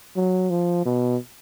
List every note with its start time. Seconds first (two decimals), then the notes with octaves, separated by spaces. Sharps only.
0.16 F#3
0.50 F3
0.85 B2